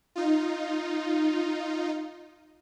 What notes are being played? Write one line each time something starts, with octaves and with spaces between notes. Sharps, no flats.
D#4 F4